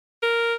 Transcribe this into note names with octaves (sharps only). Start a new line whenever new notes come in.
A#4